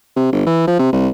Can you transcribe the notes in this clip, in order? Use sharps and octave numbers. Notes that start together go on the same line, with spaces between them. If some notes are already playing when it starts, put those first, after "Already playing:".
C3
G1
E3
F3
C3
C2